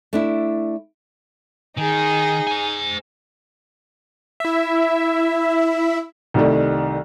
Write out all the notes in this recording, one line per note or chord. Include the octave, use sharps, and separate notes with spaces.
A3 D4 E4
D#3 D#4 G#4
C5 G#5
E4 E5
C2 D#3 G3 A3